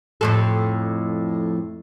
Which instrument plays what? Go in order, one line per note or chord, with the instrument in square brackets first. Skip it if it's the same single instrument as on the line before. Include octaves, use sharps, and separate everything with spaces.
[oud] F2 A2 A4